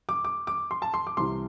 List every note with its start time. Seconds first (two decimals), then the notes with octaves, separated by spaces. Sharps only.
0.09 D6
0.25 D6
0.47 D6
0.71 C6
0.82 A5
0.94 C6
1.07 D6
1.17 C2 C3 E3 C6